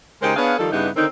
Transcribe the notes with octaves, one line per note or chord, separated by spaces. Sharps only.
C#3 G#3 D#4 G4 A#4 C5
B3 D4 G#4 C#5 F5
D#3 F3 G3 D#4 A4
G2 C#3 G3 B3 D#4 E4
D3 D#3 C4 C#4 D#4 A#4